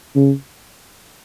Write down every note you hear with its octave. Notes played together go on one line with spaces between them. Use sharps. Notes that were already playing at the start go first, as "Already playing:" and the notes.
C#3